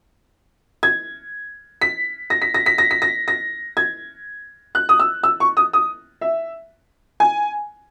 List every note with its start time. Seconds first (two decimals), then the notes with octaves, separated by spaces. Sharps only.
0.83 G#6
1.81 B6
2.30 A#6
2.42 B6
2.54 A#6
2.66 B6
2.78 A#6
2.91 B6
3.02 A#6
3.28 A#6
3.77 G#6
4.75 F#6
4.89 D#6
4.99 E6
5.23 E6
5.40 C#6
5.57 D#6
5.73 D#6
6.21 E5
7.20 G#5